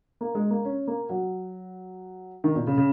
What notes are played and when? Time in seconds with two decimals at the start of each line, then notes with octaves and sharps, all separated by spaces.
0.21 A#3
0.35 G#3
0.50 A#3
0.65 C#4
0.87 A#3
1.09 F#3
2.44 D#3
2.55 A#2
2.67 C#3
2.77 C#3